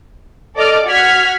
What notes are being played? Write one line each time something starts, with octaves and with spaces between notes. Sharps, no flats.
A4 D5 D#5 D6 F6
F#4 F#5 F6 G#6 B6